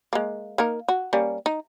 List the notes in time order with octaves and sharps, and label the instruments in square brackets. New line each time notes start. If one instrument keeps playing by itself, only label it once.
[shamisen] G#3 A#3
A#3 D#4 A#4
F#4
G3 A#3 C#4
D#4